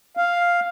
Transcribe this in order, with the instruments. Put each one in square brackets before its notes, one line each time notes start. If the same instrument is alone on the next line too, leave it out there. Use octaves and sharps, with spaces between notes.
[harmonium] F5